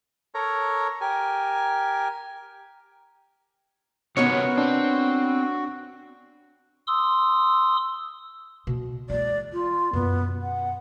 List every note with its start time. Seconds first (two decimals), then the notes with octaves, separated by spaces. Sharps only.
0.35 A4 A#4 C#5 A#5
1.01 G4 A#4 G#5
4.17 C3 B3 C#4 D#4 F#4 A#4 C#5 C#7
4.58 C4 D4
6.87 C6 D#6 E6
8.67 B2
9.10 E3 G#3 D5
9.53 F4
9.93 F#2 B2 B3
10.42 F#5